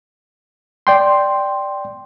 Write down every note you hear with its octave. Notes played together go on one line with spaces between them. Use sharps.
D5 G5 C6